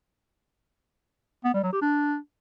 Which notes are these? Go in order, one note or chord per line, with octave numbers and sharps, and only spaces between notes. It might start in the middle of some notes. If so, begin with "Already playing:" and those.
B3
G3
F#3
G4
D4